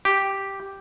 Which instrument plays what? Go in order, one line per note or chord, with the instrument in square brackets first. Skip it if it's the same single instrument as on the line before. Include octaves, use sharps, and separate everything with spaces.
[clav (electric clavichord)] G4